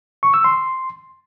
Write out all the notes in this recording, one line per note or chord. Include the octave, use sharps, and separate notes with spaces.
C#6
E6
C6